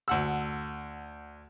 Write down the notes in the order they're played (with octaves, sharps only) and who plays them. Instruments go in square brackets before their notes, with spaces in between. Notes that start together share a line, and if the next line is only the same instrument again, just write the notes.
[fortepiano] D2 F#5 E6